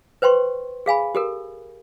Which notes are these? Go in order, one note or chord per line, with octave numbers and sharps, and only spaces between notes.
B4 C5 G5 C6 C#6
G#4 F5 G#5 B5
G4 A4 A#4